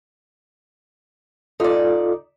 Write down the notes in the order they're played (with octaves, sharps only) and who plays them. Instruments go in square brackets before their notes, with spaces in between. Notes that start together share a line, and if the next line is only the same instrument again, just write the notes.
[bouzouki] D#4 D5 [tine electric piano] F4 A4